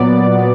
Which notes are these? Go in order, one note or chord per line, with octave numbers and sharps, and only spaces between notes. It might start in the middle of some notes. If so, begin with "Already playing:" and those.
Already playing: A#2 F#3 B3 D5
A#2 F#3 B3